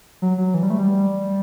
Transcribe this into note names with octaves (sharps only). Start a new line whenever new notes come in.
F#3
F#3
E3
G3
A3
G3